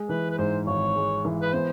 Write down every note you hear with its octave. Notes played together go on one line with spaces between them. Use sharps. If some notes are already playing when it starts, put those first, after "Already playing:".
Already playing: G#3
E3 B4
B4
G#2 C5
G#1 C#5
G#3
E3
B4
B3 C5